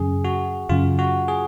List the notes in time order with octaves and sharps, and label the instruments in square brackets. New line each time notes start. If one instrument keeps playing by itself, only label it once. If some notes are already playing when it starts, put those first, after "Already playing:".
Already playing: [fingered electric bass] F#2 C#3 F#3 C#4 [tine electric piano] G#4
[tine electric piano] F#4
[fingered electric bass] F#2 C#3 F#3 C#4 [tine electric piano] F4
[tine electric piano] F#4
G#4